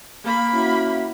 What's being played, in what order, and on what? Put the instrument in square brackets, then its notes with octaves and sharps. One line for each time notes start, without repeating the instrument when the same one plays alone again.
[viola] A#3 B5
[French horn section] C#4 E4 F#4